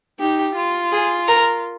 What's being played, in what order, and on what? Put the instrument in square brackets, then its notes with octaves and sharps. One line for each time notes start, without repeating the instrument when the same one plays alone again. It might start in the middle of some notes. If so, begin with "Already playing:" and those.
[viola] D#4 [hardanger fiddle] G4
[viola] F4
[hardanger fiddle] G#4
A#4